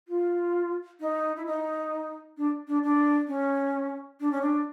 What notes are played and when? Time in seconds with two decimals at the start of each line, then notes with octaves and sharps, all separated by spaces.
0.08 F4
1.00 D#4
1.36 E4
1.46 D#4
2.37 D4
2.68 D4
2.83 D4
3.28 C#4
4.20 D4
4.32 C#4
4.42 D4